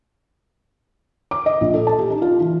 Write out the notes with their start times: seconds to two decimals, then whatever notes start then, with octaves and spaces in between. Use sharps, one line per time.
1.31 D6
1.46 D#5
1.61 A#1
1.74 A4
1.87 A5
1.99 G4
2.10 D#4
2.22 F4
2.40 E3